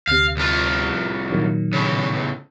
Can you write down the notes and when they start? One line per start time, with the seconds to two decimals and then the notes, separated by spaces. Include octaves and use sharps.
0.08 D2 C3 F5
0.37 C2 F4
1.31 A#2 D#3 F#3
1.73 A2 C#3